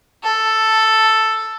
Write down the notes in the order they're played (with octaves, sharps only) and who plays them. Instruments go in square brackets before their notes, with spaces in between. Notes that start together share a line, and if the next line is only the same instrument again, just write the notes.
[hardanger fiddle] A4